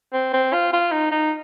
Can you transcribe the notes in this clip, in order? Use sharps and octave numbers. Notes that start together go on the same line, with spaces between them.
C4
C4
F4
F4
D#4
D#4